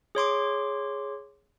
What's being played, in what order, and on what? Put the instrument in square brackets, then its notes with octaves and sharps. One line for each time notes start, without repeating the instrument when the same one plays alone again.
[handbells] G#4 C#5 C6 D6